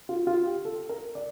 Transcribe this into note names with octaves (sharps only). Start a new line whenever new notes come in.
F4
F4
G4
A4
A#4
D5